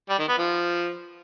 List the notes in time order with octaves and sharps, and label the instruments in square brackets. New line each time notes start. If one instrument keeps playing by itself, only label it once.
[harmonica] G3
D#3
B3
F3